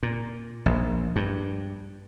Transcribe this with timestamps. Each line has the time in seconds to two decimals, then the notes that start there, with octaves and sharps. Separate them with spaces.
0.03 A#2
0.66 A#1
1.16 G2